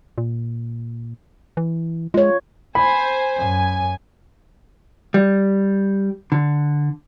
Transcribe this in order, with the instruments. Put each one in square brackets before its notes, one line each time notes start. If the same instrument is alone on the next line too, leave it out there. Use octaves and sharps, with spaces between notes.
[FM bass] A#2
E3
[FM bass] G#3 [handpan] F4 C#5
[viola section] C5 G#5 [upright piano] B5
[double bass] F#2 [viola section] G#5
[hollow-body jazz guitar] G3
D3